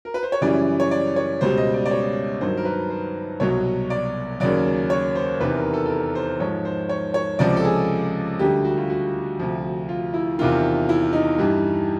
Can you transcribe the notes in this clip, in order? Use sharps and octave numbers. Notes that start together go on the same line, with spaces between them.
A#4
B4
C5
C#5
F#2 C#3 E3 G3 D5
C#5
D5
C#5
C#2 B2 G3 C5
D#5
D5
D5
C#5
G2 D#3 F#3 C5
A#4
B4
C5
C2 B2 F#3 C#5
D5
D#2 C#3 F#3 D5
C#5
C5
E2 C3 D#3 B4
A#4
A4
A4
A#4
C5
G#2 F3 C#5
C5
C#5
C#5
C#2 C3 F3 D5
A4
G#4
D2 D3 G3 G4
F#4
F4
F#4
D2 C3 F3
F4
E4
E2 C3 D#3 F4
E4
D#4
G2 E3 G3